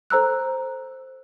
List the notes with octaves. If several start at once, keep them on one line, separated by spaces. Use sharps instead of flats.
A4 C5 A#5 E6 F#6